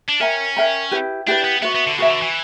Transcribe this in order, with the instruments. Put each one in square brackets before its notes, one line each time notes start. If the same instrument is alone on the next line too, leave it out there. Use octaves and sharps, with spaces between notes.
[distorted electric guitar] D4
[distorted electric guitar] C#4 [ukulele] A#4 E5 G5 A#5
[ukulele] A#4 E5 G5 A#5
E4 G4 B4
[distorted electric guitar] D4 [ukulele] E4 G4 B4
[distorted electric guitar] B3
[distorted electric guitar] B3 [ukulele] F#4 B4 E5
[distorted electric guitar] B3
D3
[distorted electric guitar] C#3 [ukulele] F#4 B4 E5
[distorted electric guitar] D3
E3